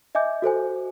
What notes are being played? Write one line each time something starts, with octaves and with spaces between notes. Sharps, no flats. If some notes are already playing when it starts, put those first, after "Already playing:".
D#5 E5 G#5 D6 G6
F#4 A4 C5 G#5